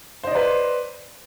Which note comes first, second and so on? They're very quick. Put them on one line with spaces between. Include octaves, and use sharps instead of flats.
C5 D#5 D5 B4 C6